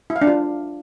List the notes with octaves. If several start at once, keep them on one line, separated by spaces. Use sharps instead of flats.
E4
F5
D4
F4